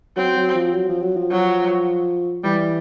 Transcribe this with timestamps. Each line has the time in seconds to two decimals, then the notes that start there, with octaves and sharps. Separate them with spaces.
0.16 F#3 C4
0.36 F#3
0.55 F3
0.73 F#3
0.88 F3
1.02 F#3
1.16 F3
1.31 F#3
2.44 E3 G3